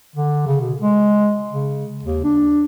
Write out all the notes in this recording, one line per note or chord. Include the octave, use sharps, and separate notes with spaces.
D3
C#3
B2
G#3
C#3
D#2
D4